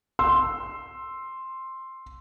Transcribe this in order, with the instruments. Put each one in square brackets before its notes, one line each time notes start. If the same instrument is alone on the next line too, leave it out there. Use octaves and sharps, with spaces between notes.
[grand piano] C6 E6